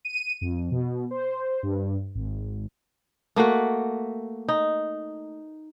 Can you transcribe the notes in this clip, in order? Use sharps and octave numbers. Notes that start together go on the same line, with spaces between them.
D#7
F2
B2
C5
G2
G#1
A3 A#3 F#4 F#5
D#4